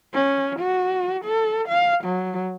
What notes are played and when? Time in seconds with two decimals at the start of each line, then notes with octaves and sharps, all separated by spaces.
0.14 C#4
0.59 F#4
1.25 A4
1.69 F5
2.04 F#3